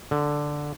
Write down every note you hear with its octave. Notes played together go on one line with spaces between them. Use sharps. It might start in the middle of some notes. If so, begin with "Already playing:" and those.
D3